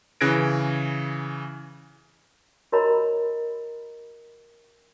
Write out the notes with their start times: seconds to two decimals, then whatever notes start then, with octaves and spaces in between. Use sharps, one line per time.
0.21 C#3 E3 F#6 G#6 A#6 D7
2.72 F#4 A#4 C#5 D#5 A#5 B5